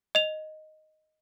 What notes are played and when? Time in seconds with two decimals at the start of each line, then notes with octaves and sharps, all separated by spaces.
0.15 D#5 F7